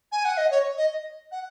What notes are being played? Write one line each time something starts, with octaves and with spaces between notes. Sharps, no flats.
G#5
F#5
D#5
C#5
D#5
F#5